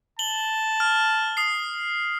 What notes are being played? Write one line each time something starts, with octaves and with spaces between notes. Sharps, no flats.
A5 F#7 G7
F6
D#6 C7